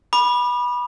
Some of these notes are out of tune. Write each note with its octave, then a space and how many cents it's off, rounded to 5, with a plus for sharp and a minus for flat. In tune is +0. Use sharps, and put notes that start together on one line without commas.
B5 -15 D6 +35